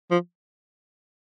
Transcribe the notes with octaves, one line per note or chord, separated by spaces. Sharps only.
F3